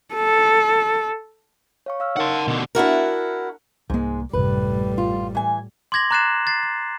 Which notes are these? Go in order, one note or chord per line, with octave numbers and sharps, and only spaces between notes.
A4
C#5 F5 C#6
F5 E6 F6
D#4 A#4 F#5 A5 C6
B2 D3
D4 E4 F#4 A#4
C2 G#2 G#3 A#3
A1 F#2 A2 C3 G3 B4
F4
E3 G#5
C6 D6 G#6 A#6 F#7
A#5 D6 F#6 A6 C7 E7
F#6 A6 C7
A6